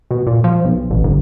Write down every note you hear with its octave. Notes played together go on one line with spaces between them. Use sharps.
B2
A#2
F3
B1
A1
G1